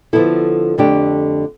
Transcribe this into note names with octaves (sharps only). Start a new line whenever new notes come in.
D3 F3 B3 E4 A4
F2 D3 A3 D4 G4